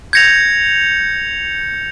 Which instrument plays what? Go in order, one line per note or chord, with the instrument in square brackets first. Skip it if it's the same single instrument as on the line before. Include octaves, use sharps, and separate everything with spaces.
[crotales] G6 C#7 F7 [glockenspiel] G#6 A#6